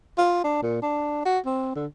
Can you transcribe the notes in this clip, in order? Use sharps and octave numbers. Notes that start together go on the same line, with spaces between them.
F4
D4
A#2
D4
F#4
C4
D3